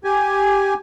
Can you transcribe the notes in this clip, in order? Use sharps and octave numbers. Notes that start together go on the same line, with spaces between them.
G4 G#5